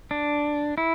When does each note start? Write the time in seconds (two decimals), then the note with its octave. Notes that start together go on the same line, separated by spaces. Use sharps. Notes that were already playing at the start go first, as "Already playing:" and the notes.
0.11 D4
0.78 E4